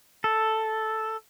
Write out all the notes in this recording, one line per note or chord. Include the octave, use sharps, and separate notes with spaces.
A4